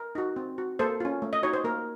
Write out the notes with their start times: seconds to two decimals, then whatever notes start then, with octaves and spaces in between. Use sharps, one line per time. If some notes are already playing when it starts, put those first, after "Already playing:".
Already playing: A#4
0.15 D#4 F#4
0.36 C4
0.58 F#4
0.79 A#3 A4 C5
1.00 C#4 F4
1.22 A3
1.33 D#5
1.43 D#4 F#4 C#5
1.53 C5
1.64 A#3 A#4